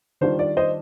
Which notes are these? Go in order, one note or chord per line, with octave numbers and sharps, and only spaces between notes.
D#3 G3 D4 F4 C5
D5
C5 D#5